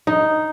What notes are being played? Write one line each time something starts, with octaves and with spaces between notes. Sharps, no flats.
D#4